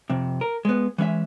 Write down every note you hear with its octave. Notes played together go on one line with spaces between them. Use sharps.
F2 C3
A#4
G#3 B3
E3 G#3 C#4 E5